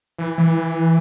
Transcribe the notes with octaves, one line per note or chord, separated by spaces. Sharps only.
E3
E3